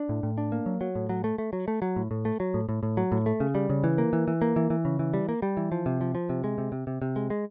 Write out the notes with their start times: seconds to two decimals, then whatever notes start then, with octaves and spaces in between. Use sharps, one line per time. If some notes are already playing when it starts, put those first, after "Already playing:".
Already playing: D4
0.09 A2
0.23 A2
0.38 D4
0.52 A#3
0.66 F#3
0.81 F#3
0.95 A2
1.09 F#3
1.24 A3
1.38 A3
1.53 F#3
1.68 A3
1.82 F#3
1.96 A2
2.11 A2
2.25 A3
2.40 F#3
2.54 A2
2.69 A2
2.83 A2
2.97 F#3
3.12 A2
3.26 A3
3.40 C#3
3.55 G3
3.70 C#3
3.84 E3
3.98 A#3
4.13 E3
4.28 E3
4.42 A#3
4.56 E3
4.70 E3
4.85 C#3
4.99 E3
5.14 G3
5.29 A#3
5.42 G3
5.57 E3
5.72 F3
5.86 C3
6.01 F3
6.15 F3
6.29 C3
6.44 G#3
6.58 C3
6.72 C3
6.87 C3
7.02 C3
7.16 G#3
7.30 G#3